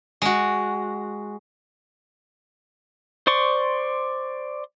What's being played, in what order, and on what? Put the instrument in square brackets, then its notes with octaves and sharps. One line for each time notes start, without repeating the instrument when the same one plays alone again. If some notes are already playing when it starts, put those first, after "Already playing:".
[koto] G#3 F#4
[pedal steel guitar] C5 D5 C6 C#6